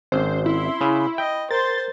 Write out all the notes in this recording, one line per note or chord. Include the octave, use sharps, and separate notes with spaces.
G#1 C4 C#4 C5
E4 C6
C#3 B5
D#5 G5
A#4 C5 C6 A6